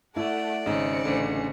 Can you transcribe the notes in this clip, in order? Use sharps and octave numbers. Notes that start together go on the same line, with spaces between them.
A3 E4 D5 F#5
G#1 C#3 C4 D#4 C#7
A1 D3